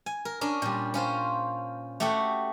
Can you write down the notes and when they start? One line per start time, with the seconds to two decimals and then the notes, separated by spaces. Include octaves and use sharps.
0.06 G#5
0.25 A#4
0.41 C#4 D4 A#4
0.62 A#2 G3
0.94 C#4 F4 C5
2.00 A3 F#4 G4 A4 F#5